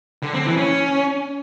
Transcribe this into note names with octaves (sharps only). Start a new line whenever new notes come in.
D3
C4
E3
C#4